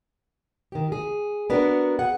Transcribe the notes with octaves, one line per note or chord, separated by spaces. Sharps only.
D#3 G4
G#4
B3 D4 F#4 A#4
G#4 F#5